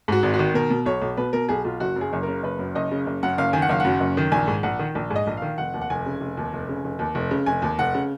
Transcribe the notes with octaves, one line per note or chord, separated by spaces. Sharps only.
G#2 F#4
G#1
F#4
D#3
B2 A#4
B2
B1 C#5
B1
B2 B4
B2 A#4
B1 G#4
B1 F4
F#1 F#4
F#2
G#4
F#1
C#3 A#4
F#1 B4
F#2
F#1 D#5
C#3
F#1
F#2 F#5
F#1 F5
D#3 G#5
F#5
F#1 F5
F#2 F#5
F#1
D#3
A#1 G#5
G#2
A#1 F#5
D#3
A#1
G#2
D#5
A#1
D#3 F5
F1 F#5
D#2
F#5
F1 G#5
C#3
F1
D#2
F1
C#3
F1
D#2
F1
C#3
F1 G#5
D#2
F1 F#5
C#3